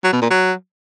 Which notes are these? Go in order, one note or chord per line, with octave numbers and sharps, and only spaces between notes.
F#3
B2
A#2
F#3